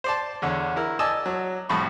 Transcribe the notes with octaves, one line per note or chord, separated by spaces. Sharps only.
C5 D5 A5
E2 D3 C#5
E4 A#4
D5 D#5 G#5 A5 E6
F#3
C2 F2 A2 B5 C#6